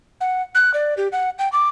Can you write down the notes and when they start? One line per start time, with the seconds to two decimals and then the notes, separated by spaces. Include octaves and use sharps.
0.21 F#5
0.55 F#6
0.74 D5
0.97 G4
1.12 F#5
1.39 G5
1.52 D6